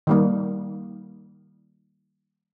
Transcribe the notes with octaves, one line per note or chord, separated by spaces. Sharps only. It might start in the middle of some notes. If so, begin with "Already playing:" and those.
D#3 G3 A#3